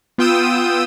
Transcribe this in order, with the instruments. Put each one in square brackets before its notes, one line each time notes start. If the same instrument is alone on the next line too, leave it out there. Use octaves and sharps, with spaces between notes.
[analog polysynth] B3 F4 G5 D#6 E6 D#7